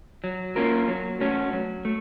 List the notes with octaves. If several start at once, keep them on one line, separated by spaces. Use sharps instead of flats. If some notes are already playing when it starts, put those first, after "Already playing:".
F#3
A#3 C#4 F4 A#4
F#3
A3 C#4 F#4
F#3
A3